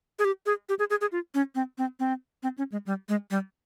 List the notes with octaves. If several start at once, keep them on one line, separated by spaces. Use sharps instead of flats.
G#4
G4
G#4
G4
G#4
G#4
G#4
F4
C#4
C4
C4
C4
C4
C#4
G#3
G3
G#3
G3